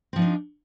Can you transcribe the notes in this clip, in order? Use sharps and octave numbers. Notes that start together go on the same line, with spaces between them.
F3 C4 D4 D#4